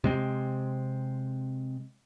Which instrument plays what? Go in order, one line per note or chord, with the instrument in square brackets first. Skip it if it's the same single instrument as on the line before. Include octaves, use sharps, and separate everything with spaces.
[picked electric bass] C3 G#3 C4